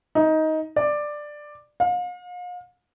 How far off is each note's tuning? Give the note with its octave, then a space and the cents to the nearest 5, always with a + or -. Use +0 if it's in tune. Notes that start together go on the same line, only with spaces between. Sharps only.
D#4 +15
D5 +10
F5 +40